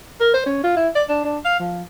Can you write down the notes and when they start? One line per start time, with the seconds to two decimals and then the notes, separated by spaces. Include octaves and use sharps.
0.20 A#4
0.34 C5
0.46 C#4
0.64 F4
0.77 E4
0.95 D5
1.09 D4
1.24 D4
1.45 F5
1.60 F3